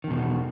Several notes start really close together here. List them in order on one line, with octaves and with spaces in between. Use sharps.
D#3 E2 B2